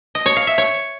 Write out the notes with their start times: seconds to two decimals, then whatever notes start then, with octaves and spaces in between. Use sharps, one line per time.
0.15 D#5
0.26 C#5
0.36 F5
0.47 E5
0.58 C#5